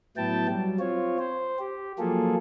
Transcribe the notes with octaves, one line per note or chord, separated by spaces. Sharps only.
A2 F#3 B3 E4 G5 A5
F#3 G3
C4 F4 C#5
C5
G4
F3 F#3 A#3 F4 G#4 A4